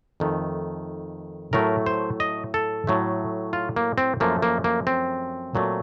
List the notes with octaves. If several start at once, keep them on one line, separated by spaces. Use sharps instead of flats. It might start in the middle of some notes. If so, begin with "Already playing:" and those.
F2 D#3 A3
A2 F#3 A3 A#4
C5
D#5
A4
A2 F#3 A3
F4
A#3
C4
F#2 F3 A3 A#3
A#3
A#3
C4
A#2 F#3 A3